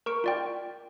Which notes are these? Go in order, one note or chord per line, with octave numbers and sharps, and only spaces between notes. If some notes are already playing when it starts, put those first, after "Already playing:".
A#4 C#6 D7
F4 D5 G5